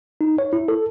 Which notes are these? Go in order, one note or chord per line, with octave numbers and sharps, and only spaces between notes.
D#4
C#5
E4
A4